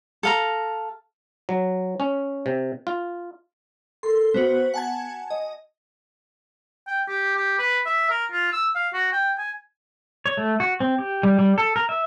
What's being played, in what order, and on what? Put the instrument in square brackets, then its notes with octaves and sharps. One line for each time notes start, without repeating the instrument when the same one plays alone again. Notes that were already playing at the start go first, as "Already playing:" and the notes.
[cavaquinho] A4 F5 A#5
[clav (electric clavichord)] F#3
C#4
C3
F4
[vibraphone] A4 A#4 [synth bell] C6
[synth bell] B3 F#4 [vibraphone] C5
[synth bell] F#5 A5 G#6 [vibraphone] G#5
[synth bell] D#5
[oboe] G5
G4
G4
B4
E5
A#4
F4
E6
F5
F#4
G5
G#5
[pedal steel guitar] C#5
A3
F#4
C4
G4
G3
G3
A4
A#4
E5